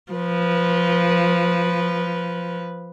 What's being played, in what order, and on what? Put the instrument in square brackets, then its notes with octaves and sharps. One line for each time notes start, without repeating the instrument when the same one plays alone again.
[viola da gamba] F3 B4